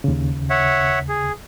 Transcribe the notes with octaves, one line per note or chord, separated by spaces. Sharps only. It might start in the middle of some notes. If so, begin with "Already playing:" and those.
D#2 C#3
C#5 E5 F#5
G#4